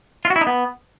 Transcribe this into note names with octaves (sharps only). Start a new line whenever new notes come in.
F4
F#4
E4
D#4
B3